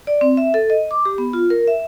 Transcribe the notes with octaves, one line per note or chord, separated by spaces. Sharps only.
D5
C4
E5
A4
D#5
D6
G4
B3
F4
A#4
E5